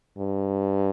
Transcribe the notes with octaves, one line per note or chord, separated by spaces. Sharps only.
G2